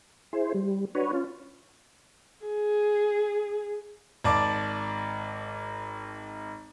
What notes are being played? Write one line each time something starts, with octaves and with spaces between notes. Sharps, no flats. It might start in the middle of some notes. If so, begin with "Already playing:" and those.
E4 G#4 C5
G3
D4 F#4 B4 C#5
C#4 F4
G#4
G#1 D5 A5 D6